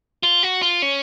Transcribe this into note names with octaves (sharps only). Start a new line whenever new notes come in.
F4
F#4
F4
C#4